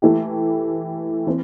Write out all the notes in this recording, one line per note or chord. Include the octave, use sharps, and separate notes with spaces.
E3 A3 E4 G4
E3 C4